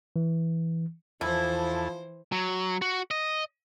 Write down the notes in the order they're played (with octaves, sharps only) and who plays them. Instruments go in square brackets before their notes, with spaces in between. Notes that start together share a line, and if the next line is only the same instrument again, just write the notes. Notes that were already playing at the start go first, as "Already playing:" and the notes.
[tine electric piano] E3
[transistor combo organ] E2 A4 [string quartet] E3 C5 [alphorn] F3 [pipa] E4
[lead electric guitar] F#3
F#4
D#5